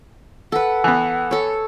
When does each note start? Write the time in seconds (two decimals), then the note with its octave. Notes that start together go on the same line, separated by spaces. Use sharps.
0.52 A4 B4 F#5
0.84 E3 B3
1.31 A4 C#5